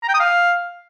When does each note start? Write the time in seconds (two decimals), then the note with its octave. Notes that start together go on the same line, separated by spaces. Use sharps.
0.03 A#5
0.08 G5
0.14 D#6
0.20 F5